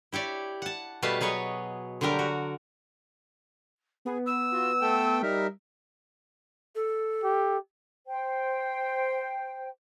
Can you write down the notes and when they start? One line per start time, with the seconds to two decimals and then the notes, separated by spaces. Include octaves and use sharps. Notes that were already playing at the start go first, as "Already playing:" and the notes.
0.12 E4 G4 C#5 D5
0.62 F#5 A5
1.02 B2 G3 A3 B4 F5 A5
1.21 F#3 G#4 B4 C#5 D#5
2.01 D3 F#3 G3 G4 A#4
2.19 F#4
4.05 B3 G#4
4.26 E6
4.52 F4 F#4
4.81 A3 A4 G5
5.22 G3 D#4 A#4 E5
6.75 A4
7.23 G4
8.07 C5 G5